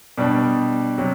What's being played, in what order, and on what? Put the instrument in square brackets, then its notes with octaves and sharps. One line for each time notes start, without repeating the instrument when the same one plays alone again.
[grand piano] B2 G3 D4
C3 F#3